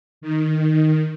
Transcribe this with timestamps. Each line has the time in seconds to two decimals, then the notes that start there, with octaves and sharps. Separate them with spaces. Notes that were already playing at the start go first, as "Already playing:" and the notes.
0.21 D#3